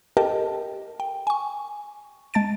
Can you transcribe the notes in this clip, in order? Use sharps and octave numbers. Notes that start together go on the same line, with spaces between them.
G4 A4 A#4 D#5 G5 A5
G5
G#5 C#6
G#3 A5 A6 D7